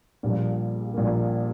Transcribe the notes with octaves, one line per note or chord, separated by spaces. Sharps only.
A#1 A#2 G3 A#3
A#1 A#2 G3 A#3